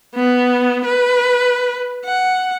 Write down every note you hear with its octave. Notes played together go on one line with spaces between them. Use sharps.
B3
B4
F#5